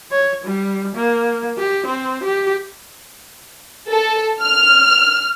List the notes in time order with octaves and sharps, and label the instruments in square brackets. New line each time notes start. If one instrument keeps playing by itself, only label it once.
[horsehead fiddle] C#5
G3
A#3
G4
C4
G4
[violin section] A4
F6